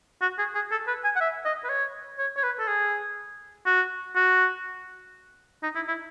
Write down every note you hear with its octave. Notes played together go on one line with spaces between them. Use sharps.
F#4
G#4
G#4
A4
B4
G#5
F#5
E5
D#5
B4
C#5
C#5
C#5
B4
A4
G#4
F#4
F#4
D#4
E4
E4